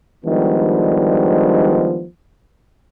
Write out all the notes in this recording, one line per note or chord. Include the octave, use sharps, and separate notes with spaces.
D#3 F3 G3 G#3 B3 D4